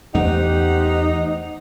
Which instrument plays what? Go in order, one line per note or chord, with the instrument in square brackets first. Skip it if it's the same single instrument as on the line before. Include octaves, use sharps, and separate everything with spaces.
[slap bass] E2 A3 [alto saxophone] D#4 [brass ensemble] G4 C5 F#5